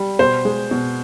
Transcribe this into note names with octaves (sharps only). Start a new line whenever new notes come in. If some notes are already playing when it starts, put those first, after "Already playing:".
Already playing: G3
B2 C5
G#3
B2